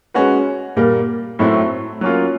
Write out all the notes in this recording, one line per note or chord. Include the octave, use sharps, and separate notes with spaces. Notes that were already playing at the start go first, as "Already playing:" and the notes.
G#3 C#4 F#4 B4
A#2 G3 A#3
A2 F#3 A3 C4 E4
F#3 A#3 C#4 F4